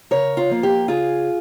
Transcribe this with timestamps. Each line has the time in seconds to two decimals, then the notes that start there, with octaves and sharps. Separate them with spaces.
0.11 C#3 A#4 C#5
0.37 F4
0.49 F3 A#3
0.63 G4
0.88 C#3 F4 G#4